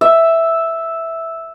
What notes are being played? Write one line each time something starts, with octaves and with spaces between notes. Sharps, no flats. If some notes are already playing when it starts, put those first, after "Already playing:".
E5